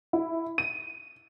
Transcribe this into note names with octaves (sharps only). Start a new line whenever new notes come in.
E4
D#7